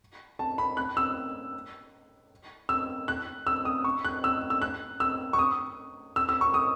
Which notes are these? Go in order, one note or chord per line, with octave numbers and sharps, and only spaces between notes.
A5
B5
F#6
E6
E6
F#6
E6
D#6
C#6
F#6
E6
E6
F#6
E6
C#6
D#6
E6
E6
C#6
D#6